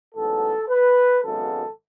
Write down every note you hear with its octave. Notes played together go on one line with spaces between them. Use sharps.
A1 G#2 F#3 B3 A4
B4
G#1 F#2 C#3 G#3 B3 A4